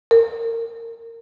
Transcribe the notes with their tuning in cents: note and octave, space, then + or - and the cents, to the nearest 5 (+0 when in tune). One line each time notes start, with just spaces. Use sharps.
A#4 -20